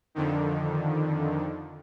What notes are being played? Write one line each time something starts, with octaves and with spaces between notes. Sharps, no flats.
F2 D3 D#3